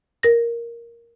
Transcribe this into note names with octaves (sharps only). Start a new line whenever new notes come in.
A#4 A#6